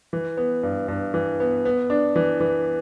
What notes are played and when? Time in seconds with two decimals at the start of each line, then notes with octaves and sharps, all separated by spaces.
0.13 E3
0.37 B3
0.63 G2
0.88 G2
1.14 E3
1.40 B3
1.65 B3
1.90 D4
2.16 E3
2.40 E3